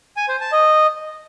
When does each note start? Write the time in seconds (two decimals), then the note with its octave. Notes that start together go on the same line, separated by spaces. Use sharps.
0.17 G#5
0.29 C5
0.40 A5
0.52 D#5